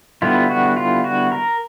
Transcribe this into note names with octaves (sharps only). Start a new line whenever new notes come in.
D3 G3 B3 E4 F4
F#4
F4
F#4
A#4